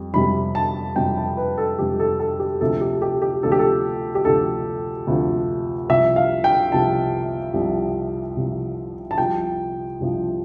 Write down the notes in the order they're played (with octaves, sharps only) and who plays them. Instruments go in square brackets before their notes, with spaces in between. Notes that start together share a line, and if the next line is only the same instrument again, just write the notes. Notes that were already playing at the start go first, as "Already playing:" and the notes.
Already playing: [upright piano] F2 G3
F2 C3 G3 B5
A5
F2 C3 G3 G5
A5
B4
A4
F2 C3 G3 G4
A4
A4
G4
D2 C3 F3 A4
G4
G4
G4
D2 C3 F3 A4
G4
A4
G4
D2 C3 F3 A4
D2 C3 F3
C2 C3 F3 E5
F5
G5
C2 C3 F3 A5
C2 C3 F3
C2 C3 F3
A5
C2 C3 F3 G5
C2 C3 F3